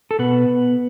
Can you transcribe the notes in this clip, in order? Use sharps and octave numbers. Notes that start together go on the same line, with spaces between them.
A4
B2 B3 B4